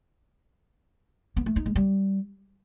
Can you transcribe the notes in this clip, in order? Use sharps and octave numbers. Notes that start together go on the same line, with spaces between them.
B3
A3
D#4
G#3
G3